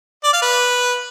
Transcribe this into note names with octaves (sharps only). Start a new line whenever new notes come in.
D5
F5
B4